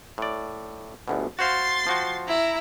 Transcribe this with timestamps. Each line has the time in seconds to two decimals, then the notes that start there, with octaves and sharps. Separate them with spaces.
0.18 A2 D5
1.08 G1 D2 B2
1.39 F#4 C5 F5 C6 A6
1.87 F3 F#4 G5
2.27 E4 A#5